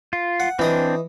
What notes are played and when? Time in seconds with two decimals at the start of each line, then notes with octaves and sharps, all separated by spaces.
0.13 F4
0.40 F#5
0.59 E3 C4 D4 D#5 D#6